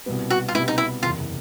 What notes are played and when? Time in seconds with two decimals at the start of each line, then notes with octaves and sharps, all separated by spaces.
0.06 C2 B2 G3 B3
0.30 F#4
0.48 F4
0.54 C2 B2 G3 B3 E4
0.68 D#4
0.78 E4
1.03 F#1 E2 C3 F4